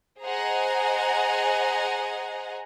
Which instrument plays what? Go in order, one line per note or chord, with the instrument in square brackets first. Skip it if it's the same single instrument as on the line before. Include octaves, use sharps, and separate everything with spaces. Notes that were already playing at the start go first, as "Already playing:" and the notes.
[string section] G#4 C5 D#5 F#5 G#5 A#5